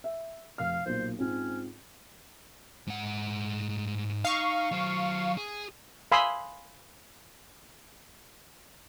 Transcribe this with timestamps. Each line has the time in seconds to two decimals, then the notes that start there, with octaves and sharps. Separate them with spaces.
0.04 E5
0.58 F1 F5 F6
0.86 B1 A#2 C5
1.18 G#2 C4 C#4 F4
2.87 G#2 F#5
4.25 D#4 F5 C#6
4.72 F#3 C5
5.38 G#4
6.12 F5 G#5 B5 C6 D#6 E6